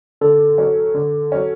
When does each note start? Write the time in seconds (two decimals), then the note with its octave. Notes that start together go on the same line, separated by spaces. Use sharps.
0.21 D3 A4
0.58 F#3 C#4
0.94 D3
1.32 F#3 C#4